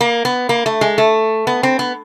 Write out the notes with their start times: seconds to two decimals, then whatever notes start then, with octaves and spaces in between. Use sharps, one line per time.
0.01 A#3
0.25 B3
0.49 A#3
0.66 A3
0.81 G#3
0.98 A3
1.47 B3
1.63 C4
1.79 B3